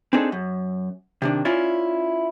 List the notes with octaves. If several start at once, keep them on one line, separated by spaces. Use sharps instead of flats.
C4 D4 D#4 G#4 A4
F#2
C3 D#3 D4
C#4 E4 F4 D5 E5